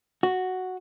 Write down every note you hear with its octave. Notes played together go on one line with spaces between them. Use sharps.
F#4